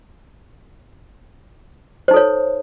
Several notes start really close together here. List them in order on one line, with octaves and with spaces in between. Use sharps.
C5 D#4 A4 C#5